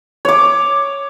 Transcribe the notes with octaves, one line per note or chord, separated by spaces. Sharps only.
C#5 D6